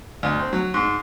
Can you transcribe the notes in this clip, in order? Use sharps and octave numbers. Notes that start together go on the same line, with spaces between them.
D2
C4
F#3
G#2